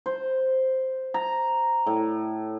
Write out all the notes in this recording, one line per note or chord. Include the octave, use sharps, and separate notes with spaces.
C5
A#5
A2